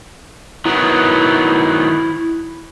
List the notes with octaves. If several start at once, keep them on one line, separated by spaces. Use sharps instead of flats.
D#3 F#3 B3 E4